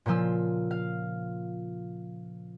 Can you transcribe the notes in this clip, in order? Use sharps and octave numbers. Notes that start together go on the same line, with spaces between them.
A#2 C#3 F3 F4 E6
F5